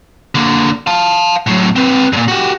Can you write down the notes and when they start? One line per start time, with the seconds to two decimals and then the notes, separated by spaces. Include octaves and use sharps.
0.35 D3 A#3
0.87 F5 A5
1.46 A2 F#3
1.76 C4 B4
2.13 G2 A#2
2.28 F#4 G4